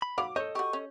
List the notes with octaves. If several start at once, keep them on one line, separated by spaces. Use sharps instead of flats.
B5
F#3 F5 D6
A4 C#5 D#5 G6
F#4 G4 C#6
C#4